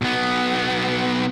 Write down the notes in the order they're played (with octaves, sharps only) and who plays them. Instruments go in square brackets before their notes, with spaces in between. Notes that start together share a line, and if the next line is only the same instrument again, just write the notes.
[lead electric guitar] B1 B3